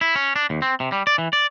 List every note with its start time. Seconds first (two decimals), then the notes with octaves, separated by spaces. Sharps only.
0.01 E4
0.16 C#4
0.36 D4
0.50 D#2
0.62 C4
0.80 C3
0.92 G3
1.07 D5
1.18 E3
1.33 D5